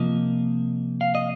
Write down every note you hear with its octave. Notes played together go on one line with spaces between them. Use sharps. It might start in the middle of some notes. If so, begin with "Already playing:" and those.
Already playing: C3 F3 A#3 D#5
F5
D#5